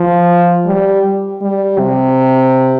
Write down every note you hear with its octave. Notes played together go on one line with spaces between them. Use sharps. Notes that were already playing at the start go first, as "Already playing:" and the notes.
Already playing: F3
G3
G3
C3